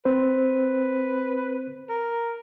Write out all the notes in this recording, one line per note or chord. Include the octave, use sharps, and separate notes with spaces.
C4 B4 C5
A#4